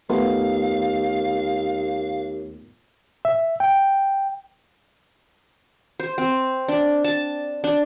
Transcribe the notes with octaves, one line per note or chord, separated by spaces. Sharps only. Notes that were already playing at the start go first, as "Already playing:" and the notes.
D#2 A3 B3 F4 F5
E5
G5
C5
C4
D4
A5
D4